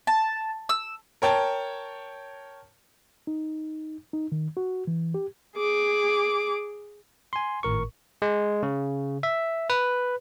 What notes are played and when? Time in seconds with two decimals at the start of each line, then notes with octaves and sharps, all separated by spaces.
0.07 A5
0.69 E6
1.22 A#4 C#5 G5 A5
3.27 D#4
4.13 D#4
4.32 D#3
4.57 F#4
4.87 E3
5.14 G4
5.56 G#4 D6
7.33 G#5 C6
7.63 G#1 A2 A#4 C#6
8.22 G#3
8.63 C#3
9.23 E5
9.70 B4